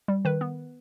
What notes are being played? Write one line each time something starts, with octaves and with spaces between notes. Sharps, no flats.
G3
D#3 B4
B3